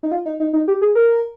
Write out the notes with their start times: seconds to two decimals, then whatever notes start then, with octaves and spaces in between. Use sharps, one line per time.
0.03 D#4
0.11 F4
0.26 D#4
0.40 D#4
0.53 D#4
0.68 G4
0.82 G#4
0.95 A#4